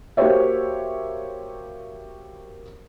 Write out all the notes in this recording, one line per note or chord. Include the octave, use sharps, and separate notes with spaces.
A#3 F#4 G4 C5 C#5 E5